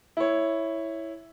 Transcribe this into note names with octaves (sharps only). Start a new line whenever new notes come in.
E4 C#5